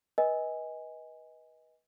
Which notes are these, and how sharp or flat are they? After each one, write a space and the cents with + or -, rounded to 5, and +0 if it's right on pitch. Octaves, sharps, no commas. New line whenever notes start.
B4 -25 D#5 +20 G#5 -5